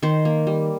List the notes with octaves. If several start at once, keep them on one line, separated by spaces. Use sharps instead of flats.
D#3 C5
A#3
G3